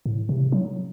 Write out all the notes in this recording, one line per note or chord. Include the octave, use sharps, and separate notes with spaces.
A2
C3
F#3